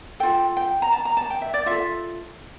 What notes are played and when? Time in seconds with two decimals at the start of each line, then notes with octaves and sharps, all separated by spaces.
0.20 F4 A4 G5
0.57 G5
0.82 A#5
0.92 A5
1.05 A#5
1.17 A5
1.30 G5
1.42 E5
1.54 D5
1.66 F4 A4 E5